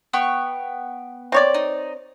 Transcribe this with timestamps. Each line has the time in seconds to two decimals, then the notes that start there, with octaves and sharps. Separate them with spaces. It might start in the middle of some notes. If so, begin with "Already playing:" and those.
0.13 B3 G5 C#6
1.32 C4 C#5 D5
1.54 D#4